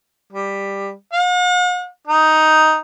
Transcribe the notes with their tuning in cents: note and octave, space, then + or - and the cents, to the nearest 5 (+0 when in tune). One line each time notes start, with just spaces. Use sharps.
G3 +10
F#5 -45
D#4 +5